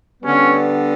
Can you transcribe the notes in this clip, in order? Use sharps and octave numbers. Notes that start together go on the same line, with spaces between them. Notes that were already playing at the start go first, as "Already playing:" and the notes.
D3 G3 B3 C#4